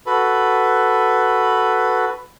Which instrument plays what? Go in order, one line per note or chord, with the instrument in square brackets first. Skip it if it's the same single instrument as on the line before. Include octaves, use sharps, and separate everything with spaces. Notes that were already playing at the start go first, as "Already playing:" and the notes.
[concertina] F#4 A4 B4